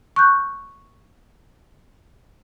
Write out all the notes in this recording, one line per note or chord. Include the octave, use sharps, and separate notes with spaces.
C#6 F#6 G6